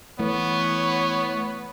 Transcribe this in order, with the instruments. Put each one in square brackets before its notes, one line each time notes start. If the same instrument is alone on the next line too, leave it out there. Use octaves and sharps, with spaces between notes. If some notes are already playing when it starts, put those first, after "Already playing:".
[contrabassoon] E3 [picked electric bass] A3 [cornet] B3 [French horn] C#5